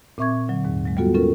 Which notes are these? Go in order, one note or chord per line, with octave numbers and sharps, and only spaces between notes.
A#2 C4 E5 C#6 D6 G#6
D3 F#3
D#2 G#2
F#3 G#3
G3 A#3 B3 F4 F#4 A4
C#4 F4 A4 A#4